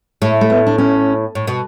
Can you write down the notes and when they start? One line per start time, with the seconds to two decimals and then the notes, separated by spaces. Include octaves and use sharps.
0.22 A2 A3
0.41 A3
0.50 B3
0.67 D4
0.78 C#4
1.35 A2
1.47 B2